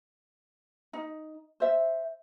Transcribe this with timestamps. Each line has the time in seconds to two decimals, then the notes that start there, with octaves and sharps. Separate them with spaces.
0.93 D#4
1.60 C5 E5